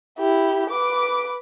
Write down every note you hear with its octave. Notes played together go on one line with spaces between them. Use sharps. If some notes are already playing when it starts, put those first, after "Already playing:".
E4 G4
B4 D6